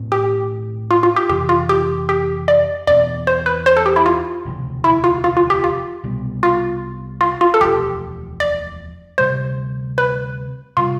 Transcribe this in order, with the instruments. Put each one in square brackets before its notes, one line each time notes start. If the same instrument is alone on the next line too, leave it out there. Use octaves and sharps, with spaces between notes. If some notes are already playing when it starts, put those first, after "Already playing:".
Already playing: [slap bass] B1 A2 C4
[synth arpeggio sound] G4
F4
F4
G4
[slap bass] F2 C3 E3 [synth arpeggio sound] G4
[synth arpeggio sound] F4
G4
G4
D5
[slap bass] E2 B2 A3 C4 [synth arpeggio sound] D5
[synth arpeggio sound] C5
B4
C5
A4
G4
E4
F4
[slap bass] E1 D2 C3 F3
[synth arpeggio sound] E4
F4
F4
F4
G4
F4
[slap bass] C2 B2 G3 B3
[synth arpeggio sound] F4
F4
F4
A4
[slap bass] E1 D2 D3 F3 [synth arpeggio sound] G4
[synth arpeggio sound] D5
[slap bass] D2 C3 G3 [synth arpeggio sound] C5
[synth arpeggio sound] B4
[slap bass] C3 G3 [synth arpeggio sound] F4